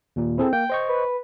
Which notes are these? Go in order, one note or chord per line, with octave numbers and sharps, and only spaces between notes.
D#2 A#2
C4 E4 G#4 A4
A#3 G5
C5 D#5 C#6
B4